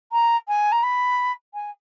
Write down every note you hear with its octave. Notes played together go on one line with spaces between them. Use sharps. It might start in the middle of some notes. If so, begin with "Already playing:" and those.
A#5
G#5
A#5
B5
G#5